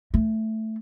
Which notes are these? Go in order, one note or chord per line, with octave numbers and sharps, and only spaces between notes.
A3